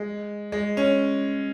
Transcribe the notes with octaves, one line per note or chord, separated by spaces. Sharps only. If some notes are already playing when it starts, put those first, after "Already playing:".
Already playing: G#3
G#3
C#4